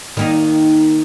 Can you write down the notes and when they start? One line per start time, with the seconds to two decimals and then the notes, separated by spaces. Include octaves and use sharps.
0.17 D#3 A#3 D#4